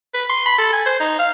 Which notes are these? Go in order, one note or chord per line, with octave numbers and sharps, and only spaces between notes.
B4
C6
B5
A4
G#5
C5
D#4
F5